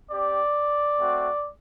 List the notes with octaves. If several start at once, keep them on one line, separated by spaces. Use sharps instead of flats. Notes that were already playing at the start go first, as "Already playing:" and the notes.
C4 G4 D5
A3 C4 F#4